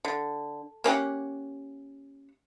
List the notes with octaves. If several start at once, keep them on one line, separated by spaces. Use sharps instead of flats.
D3
A#3 C#4 G4 F#5